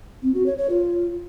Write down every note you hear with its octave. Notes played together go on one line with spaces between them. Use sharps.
C4
F#4
C#5
C#5
F4